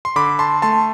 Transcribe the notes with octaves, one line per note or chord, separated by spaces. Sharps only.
C6
D3 B5 D6
A5 C6
A3 A5 C6